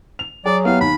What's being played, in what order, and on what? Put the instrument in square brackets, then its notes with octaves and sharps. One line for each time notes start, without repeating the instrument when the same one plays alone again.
[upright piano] F7
[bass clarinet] F#3 [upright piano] G#4 [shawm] D5
[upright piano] B3 E4 G4 [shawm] F5
[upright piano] D#2 [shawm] B5